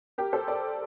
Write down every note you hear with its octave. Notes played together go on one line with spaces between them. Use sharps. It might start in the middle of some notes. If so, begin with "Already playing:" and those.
G4 A#4
A4 C5
A#4 D5